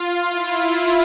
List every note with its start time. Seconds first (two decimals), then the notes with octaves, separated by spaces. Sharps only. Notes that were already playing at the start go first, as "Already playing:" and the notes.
Already playing: F4
0.28 E4
0.73 F4